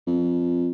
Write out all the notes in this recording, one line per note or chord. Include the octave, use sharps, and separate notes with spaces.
F2